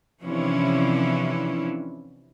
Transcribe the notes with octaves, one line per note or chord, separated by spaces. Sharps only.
C3 E3 F3 C#4 D4 E4